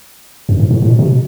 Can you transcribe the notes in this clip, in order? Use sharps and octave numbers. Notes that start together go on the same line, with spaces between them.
F#2
G#2
A2
A2
B2
C3
B2